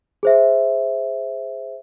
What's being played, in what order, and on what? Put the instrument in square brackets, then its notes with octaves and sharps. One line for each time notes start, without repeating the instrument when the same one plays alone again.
[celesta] G#4 C5 E5